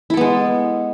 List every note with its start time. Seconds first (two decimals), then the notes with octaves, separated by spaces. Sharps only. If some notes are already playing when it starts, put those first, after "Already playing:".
0.10 E4
0.14 A4
0.17 B3
0.21 G#3